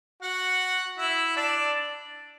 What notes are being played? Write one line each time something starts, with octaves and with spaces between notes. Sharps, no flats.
F#4 F#5
E4 E5
D4 D5